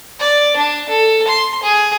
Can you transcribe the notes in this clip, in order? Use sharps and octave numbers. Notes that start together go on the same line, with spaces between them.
D5
D4
A4
C6
G#4